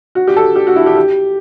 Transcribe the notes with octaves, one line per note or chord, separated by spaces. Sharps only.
F#4
G4
A4
G4
F#4
E4
G4
G4